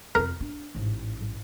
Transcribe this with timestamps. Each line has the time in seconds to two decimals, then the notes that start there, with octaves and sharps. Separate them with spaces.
0.15 F2 F4 A#4
0.40 D4
0.75 A1 G#2